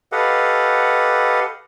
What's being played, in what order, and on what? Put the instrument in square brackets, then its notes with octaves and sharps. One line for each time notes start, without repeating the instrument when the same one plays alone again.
[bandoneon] G4 A4 B4 D#5 F5 F#5